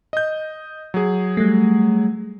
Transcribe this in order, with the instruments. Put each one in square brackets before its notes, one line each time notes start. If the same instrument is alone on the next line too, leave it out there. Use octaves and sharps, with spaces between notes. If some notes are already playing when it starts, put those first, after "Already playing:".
[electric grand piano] D#5 G6
F#3 G#4
[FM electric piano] G3 A3